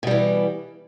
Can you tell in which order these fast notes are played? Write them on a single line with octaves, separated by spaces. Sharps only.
B2 G3 E3